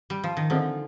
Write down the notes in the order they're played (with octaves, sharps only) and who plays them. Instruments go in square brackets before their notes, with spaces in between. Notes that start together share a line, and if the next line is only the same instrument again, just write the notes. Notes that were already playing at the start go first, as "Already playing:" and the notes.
[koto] G3
F3
D#3
[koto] D3 [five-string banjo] F3 C4 D#4 G#4